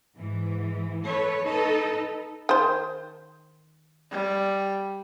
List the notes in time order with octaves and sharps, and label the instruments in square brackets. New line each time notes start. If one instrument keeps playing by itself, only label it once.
[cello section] G#2 E3
A4 B4 C#5
D#4 A4 B4
[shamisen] D#3 C5
[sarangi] G3